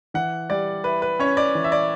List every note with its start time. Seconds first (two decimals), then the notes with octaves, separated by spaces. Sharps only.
0.14 E3 F#5
0.50 G3 D5
0.84 E4 B4
1.02 B4
1.20 C#4 C#5
1.37 D5
1.55 E3
1.64 E5
1.72 D5